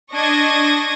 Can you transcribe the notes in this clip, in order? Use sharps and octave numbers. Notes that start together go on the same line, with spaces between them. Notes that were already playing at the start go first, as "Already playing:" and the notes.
D4 D#5 C#6 G#6 A#6